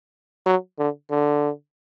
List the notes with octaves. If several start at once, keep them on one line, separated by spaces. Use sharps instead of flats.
F#3
D3
D3